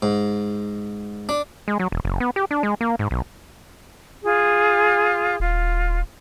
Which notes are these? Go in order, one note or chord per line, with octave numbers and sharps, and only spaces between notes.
G#2
D4
G#3
F#3
E1
F#1
B3
G4
D4
G#3
A#3
G#2
B1
F4 G#4
D#1 F4